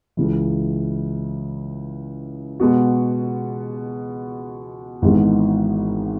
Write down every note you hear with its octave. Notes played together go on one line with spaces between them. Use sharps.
C#2 C#3 E3
B2 G#3 B3 F#4
G#1 G#2 E3 G#3 B3